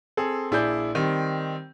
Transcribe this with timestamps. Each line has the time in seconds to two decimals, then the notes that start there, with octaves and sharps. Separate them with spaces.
0.17 C4 G#4 A4
0.51 A#1 E4 G#4 D5 G6
0.95 D#3 G3 C4